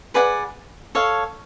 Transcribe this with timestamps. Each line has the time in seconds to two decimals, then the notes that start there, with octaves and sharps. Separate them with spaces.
0.14 G#4 B4 D5 F#5
0.95 A4 C#5 F5